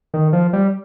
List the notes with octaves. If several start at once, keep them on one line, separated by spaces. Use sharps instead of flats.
D#3
F3
G3